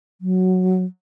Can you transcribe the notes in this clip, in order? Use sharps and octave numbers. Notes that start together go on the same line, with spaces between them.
F#3